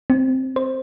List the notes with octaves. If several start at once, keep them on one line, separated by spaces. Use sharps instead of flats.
C4
C5